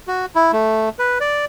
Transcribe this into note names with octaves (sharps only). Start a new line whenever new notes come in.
F#4
E4
A3
B4
D5